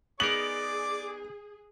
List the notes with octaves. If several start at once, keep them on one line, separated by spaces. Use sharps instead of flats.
B3 D#4 G#4 A#4 D5 D6 F#7